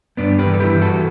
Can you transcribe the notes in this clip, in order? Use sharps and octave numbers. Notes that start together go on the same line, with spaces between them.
G2 B3 D4
G4 B4
E3
A4
E4 G4
E3
F#4 A4